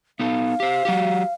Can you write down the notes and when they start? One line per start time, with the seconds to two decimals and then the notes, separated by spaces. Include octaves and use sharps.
0.19 B3 D#4 A4 F5
0.60 G4 C5
0.85 F#3 F#4 G4